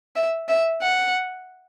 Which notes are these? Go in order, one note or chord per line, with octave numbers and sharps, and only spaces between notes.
E5
E5
F#5